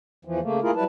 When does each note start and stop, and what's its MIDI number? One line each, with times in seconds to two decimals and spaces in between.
0.25 0.40 40
0.25 0.40 52
0.25 0.40 53
0.42 0.60 49
0.42 0.60 57
0.42 0.60 58
0.62 0.71 57
0.62 0.71 58
0.62 0.71 64
0.62 0.71 65
0.62 0.71 68
0.62 0.71 70
0.75 0.84 54
0.75 0.84 55
0.75 0.84 64
0.75 0.84 71
0.75 0.84 81